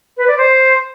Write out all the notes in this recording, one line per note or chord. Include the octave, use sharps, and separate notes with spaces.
B4
D5
C5